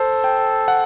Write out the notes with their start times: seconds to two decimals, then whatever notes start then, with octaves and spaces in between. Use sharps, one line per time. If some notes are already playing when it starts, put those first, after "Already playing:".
Already playing: A4 C5
0.24 G5
0.68 F#5